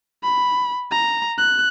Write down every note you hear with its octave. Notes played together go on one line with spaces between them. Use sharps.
B5
A#5
F#6